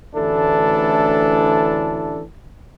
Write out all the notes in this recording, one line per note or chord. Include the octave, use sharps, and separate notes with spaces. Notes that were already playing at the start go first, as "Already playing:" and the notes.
A1 D2 E3 D4 E4 A4